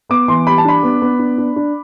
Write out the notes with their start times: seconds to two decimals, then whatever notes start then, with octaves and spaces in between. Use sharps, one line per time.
0.09 B3 D6
0.28 E3 C6
0.47 G3 B5
0.58 A5
0.65 D4 B5
0.83 B3
1.02 B3
1.19 D4
1.38 D4
1.56 D4